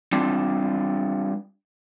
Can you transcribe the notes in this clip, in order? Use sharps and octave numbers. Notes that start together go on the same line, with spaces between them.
G3 C4 D4 F4